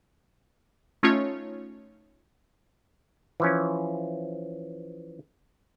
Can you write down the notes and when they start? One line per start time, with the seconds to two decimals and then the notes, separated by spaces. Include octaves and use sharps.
1.03 A3 C#4 D#4 F4 C#5
3.40 E3 F3 C#4